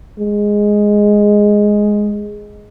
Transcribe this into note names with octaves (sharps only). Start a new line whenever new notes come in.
G#3